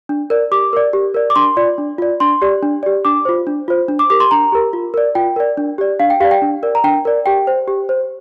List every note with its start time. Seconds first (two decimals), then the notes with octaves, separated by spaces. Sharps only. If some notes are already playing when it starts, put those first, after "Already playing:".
0.09 D4
0.30 A#4 D5
0.51 G4 D6
0.73 A#4 D5
0.93 G4
1.15 A#4 D5
1.30 D6
1.36 D4 C6
1.57 F4 D5
1.78 D4
1.98 F4 D5
2.20 D4 C6
2.42 G4 D5
2.63 D4
2.83 G4 D5
3.05 D4 D6
3.25 F4 C5
3.47 D4
3.68 F4 C5
3.88 D4
3.99 D6
4.10 G4 A#4 D6
4.20 C6
4.31 D4 A#5
4.52 G4 A#4
4.73 F4
4.94 A#4 D5
5.15 F4 G5
5.36 A#4 D5
5.57 D4
5.78 G4 D5
6.00 D4 F5
6.10 G5
6.20 G4 F5
6.24 D5
6.31 G5
6.42 D4
6.63 A#4 D5
6.75 A#5
6.84 D4 G5
7.05 A#4 D5
7.26 G4 G5
7.47 C5
7.68 G4
7.89 C5